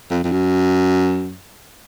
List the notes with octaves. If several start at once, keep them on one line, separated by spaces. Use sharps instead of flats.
F2
F2
F#2